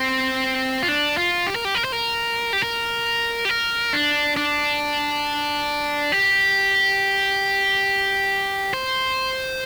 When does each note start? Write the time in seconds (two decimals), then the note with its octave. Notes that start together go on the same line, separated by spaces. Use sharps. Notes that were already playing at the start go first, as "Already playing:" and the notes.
Already playing: C4
0.83 F4
0.88 D4
1.17 F4
1.47 G4
1.56 A#4
1.65 G4
1.75 A#4
1.84 C5
1.92 A#4
2.53 G4
2.63 A#4
3.45 G4
3.49 A#4
3.93 D4
4.37 D4
6.12 G4
8.74 C5